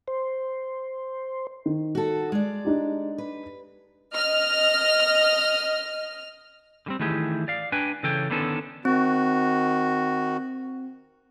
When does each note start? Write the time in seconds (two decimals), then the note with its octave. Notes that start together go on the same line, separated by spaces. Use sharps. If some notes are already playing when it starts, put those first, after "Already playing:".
0.08 C5
1.66 D#3
1.95 F#4 A4
2.32 G#3 D5
2.65 D4 D#4 G4
3.18 B4
4.14 D#5 F6
6.86 D3 G3 C4
6.99 D#3 E3 A3 E4 G4 G#4
7.48 D5 F5
7.72 D4 B4 G5 G#5
8.03 C#3 E3 A4 C#5 G5
8.30 D3 D#3 B3 C#4 A4
8.85 D#3 C4 F#4